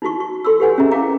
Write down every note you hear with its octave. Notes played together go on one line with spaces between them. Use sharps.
D#4 E4 F#4 C#6
C#6
A4 C6 C#6 E6
G4 A4 B4 C#5 F#5 G#5
C#4 G4 G#4 D#5 E5 A#5
E4 A#4 F5 G5 A#5 D6